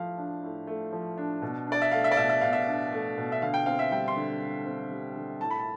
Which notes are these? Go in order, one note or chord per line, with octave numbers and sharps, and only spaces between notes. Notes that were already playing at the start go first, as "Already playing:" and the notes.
Already playing: A2 F3 A3 F5
D4
A2
A3
F3
D4
B2
D4 D5
E5
A3 F5
E5
D5
B2 E5
E5
B2 F5
E5
D4
A3
B2
E5
D3 F5
G5
C4 F5
E5
G3 G5
C6
D3
D3
C4
G3
D3
A2 A5
B5
A5